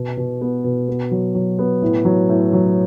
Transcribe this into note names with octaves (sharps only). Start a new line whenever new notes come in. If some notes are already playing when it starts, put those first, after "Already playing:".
Already playing: B2
B2
B3
B2
B3
F#3
F#3
B3
A2
F#3
A2
F#3